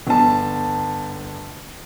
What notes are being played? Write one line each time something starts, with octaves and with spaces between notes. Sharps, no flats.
G1 A5